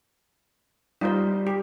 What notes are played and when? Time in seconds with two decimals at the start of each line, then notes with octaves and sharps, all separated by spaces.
1.01 G3 D#4 F4 C5
1.47 G4